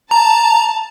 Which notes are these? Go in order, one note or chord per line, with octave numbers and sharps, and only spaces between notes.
A5 A#5